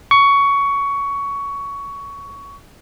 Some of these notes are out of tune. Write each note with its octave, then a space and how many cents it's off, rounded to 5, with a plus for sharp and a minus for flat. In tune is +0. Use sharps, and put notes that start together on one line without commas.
C#6 +15